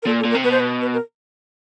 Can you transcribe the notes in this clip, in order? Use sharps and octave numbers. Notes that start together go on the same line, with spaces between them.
A#4
A#2 A4
A4
A#2
A#4
C3
B2 B4
C5
B4
B4
A#4